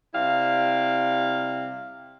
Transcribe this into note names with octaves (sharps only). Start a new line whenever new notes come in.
C3 G3 E4 F5